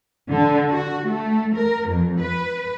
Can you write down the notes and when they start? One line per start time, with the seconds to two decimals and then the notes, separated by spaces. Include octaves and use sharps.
0.31 D3
0.69 F#4
1.07 A3
1.55 A#4
1.88 F2
2.20 B4